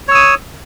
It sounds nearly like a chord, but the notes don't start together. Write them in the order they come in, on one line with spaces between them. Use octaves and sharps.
C#5 E6 D#6